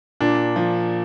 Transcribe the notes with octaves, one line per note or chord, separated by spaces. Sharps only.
A#2 D4
F3